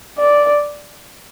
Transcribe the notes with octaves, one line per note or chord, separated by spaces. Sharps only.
D5